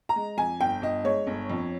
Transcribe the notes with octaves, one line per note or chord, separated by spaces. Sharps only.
A#5
G#3
F2 G#5
G1 G5
G1 D#5
G#3 C#5
G1
F2